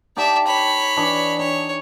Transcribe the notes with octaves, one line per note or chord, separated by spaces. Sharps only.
D#4 G4 D5 E5 A5
C#5 B5
E3 D4 D#5
D#4 C#5